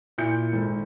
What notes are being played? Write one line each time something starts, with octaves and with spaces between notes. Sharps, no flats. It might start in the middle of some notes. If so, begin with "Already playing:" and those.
A#2 E4 G6 C#7
G#1 A4